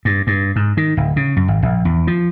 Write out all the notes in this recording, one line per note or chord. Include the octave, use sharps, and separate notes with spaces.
G2
G2
G#2
D#3
D1
C#3
F#2
G#1
A#1
E2
F3